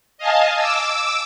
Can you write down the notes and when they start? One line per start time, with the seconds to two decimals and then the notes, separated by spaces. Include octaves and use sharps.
0.18 D#5 F5 G#5 A5
0.56 D6 E6